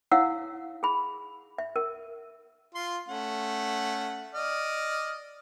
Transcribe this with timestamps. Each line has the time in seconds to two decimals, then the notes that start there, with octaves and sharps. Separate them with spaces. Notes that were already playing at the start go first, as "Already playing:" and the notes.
0.12 E4 C#5 F5 F#5 E6
0.83 G#4 B5
1.58 E5
1.76 A#4
2.75 F4 C6
3.09 A3 C#4 F#5
4.34 D5 D#5 F6